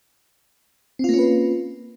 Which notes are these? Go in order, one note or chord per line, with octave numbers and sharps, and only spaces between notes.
A#3 C4 C#4 F4 B4